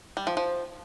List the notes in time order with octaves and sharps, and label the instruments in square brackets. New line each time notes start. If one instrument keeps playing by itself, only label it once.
[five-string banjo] G3
F3
F3